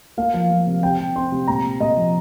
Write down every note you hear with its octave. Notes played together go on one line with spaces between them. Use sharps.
A#3 F5
F3
F3
C3
C3 G5
C3
C4 C6
C3
A#2 A#5
A#2
A#2 D#5
F3